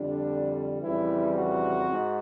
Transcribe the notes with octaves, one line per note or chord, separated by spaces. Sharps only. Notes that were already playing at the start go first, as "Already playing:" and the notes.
Already playing: F2 D3 G3 D4
F2 C#3 E3 G3 E4
F#4
G#2